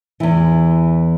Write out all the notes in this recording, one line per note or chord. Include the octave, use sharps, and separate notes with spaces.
E2 E3